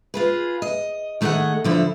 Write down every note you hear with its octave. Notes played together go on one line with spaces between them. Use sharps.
F4 G#4 B4
D#5
D#3 A3 G#4 A4 D#5 F#5
D3 F3 E4